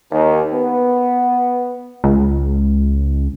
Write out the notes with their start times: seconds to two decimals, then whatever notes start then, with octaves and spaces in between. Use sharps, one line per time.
0.12 D#2
0.53 B3
2.04 C#2